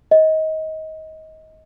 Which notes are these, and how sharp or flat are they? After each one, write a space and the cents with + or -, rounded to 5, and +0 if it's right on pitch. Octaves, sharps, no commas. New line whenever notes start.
D#5 +25